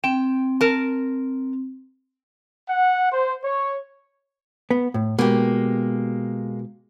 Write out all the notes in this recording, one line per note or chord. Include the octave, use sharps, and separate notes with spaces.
C4 G5
A#4 A5
F#5
C5
C#5
B3
A2
B2 G#3 A#3 G4